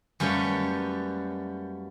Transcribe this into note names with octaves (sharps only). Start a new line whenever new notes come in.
F#2 G3 A3 A#3 B4 C#5